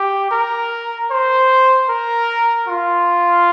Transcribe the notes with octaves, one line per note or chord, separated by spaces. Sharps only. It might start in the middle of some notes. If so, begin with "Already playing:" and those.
Already playing: G4
A#4
C5
A#4
F4